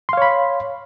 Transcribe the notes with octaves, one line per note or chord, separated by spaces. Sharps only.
C#5 F5 B5 C6